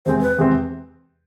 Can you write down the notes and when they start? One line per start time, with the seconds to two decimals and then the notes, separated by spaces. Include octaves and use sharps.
0.06 E2 C3 G#3 C4 C5
0.22 B4
0.38 E2 C3 G#3 C4